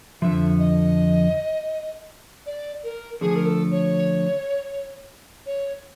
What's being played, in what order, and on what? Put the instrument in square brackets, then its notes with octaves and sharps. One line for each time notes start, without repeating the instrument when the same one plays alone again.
[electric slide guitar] F2 D3 F3 [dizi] E5
[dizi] D#5
D5
A#4
[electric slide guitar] D3 F3 A3 D4 [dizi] G#4
[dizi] A#4
A4
C#5
C#5